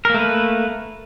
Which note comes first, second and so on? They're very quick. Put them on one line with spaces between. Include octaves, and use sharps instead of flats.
A#4 A#3 A3 B4